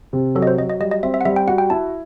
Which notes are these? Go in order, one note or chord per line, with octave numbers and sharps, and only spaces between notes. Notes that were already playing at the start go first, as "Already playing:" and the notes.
C3
F#3 A4
D#5
C5
F#3 D#5
D#5
G3 D#5
D#5
C4 E5
E5
F#5
G3 E5
G5
F#4 F#5
G5
E4 A5